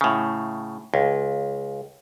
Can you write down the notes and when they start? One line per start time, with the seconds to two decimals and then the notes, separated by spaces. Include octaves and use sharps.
0.01 A2 C#3
0.94 C#2